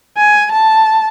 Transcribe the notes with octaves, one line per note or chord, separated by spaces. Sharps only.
G#5
A5